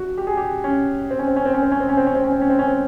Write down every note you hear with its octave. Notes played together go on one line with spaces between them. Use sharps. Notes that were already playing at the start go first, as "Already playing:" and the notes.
Already playing: F#4
G4
G#4
G4
C#4
C4
C#4
C4
C#4
C4
C#4
C4
C#4
C4
C#4
C4
C#4
C4
C#4
C4
C#4
C4
C#4
C4